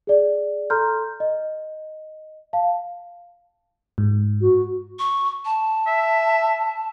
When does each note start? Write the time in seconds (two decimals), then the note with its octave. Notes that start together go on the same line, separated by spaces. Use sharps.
0.07 G#4 D5
0.70 A4 A#5 C6 F6 G6
1.20 D#5
2.53 F5 A5
3.98 G#2
4.41 F#4
4.99 C#6
5.45 A5
5.87 E5